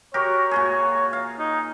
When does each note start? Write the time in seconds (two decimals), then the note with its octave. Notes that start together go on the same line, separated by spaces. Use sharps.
0.14 F#4 G4 A#4 C#5
0.51 A#2 F#4 G#4
1.13 F5
1.39 D#4